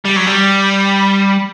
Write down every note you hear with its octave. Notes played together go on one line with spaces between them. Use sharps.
G3
F#3
G3